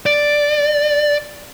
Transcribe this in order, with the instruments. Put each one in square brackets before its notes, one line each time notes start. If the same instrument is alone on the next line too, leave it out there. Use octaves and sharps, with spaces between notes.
[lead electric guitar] D5